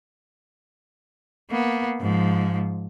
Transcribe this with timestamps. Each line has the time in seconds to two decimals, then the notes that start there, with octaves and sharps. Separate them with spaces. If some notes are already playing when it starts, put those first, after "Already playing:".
1.50 A#3 B3
2.01 G#2 F3